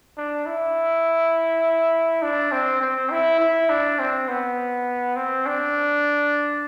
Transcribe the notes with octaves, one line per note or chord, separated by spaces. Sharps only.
D4
E4
D4
C4
C4
E4
E4
D4
C4
B3
C4
D4